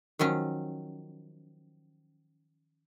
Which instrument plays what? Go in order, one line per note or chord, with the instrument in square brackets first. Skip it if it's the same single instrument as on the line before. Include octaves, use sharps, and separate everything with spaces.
[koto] D#3 F3 F#3 C#4